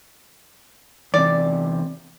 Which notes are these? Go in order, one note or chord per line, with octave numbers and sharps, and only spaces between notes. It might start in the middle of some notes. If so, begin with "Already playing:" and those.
E2 C3 D5